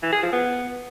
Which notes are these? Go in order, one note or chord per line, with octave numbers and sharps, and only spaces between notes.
E3
G#4
F3
B3